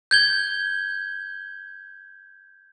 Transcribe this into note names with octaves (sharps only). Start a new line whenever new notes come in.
G6 G#6 G7